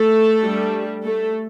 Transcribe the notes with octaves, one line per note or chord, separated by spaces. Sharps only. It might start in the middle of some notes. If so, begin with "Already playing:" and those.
Already playing: A3 A4
G3 D4
A3 A4